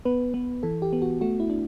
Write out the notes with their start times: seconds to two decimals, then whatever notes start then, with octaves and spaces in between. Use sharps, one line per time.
0.05 B3 B4
0.34 B3
0.63 E3 A4
0.82 G4
0.93 B3
1.02 F#4
1.21 A3 F#4
1.40 E4
1.50 D4